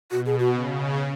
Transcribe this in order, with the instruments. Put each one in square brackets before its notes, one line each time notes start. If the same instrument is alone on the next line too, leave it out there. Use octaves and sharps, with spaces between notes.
[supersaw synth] B2 [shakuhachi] F#4
[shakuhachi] G#4
F#4
[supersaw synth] C#3